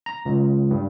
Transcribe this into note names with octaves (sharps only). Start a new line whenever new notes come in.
A#5
C#2
G2